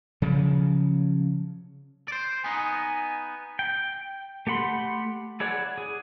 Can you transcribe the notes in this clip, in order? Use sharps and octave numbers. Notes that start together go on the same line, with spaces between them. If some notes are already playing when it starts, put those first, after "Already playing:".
C#3 F3 F#3
C5 D5
B3 D#4 G#5
G5
A3 G4 F#5 B5 C6
E4 G#4 C#5 D5 F#5
G#4